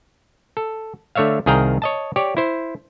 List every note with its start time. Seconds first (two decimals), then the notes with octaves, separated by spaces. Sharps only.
0.57 A4
1.15 D3 A3 C#5 E5 F5
1.46 C2 D#3 G#4 F5 G5 A#5
1.82 C#5 D#5 A5
2.16 G4 C#5 D5
2.37 E4 C5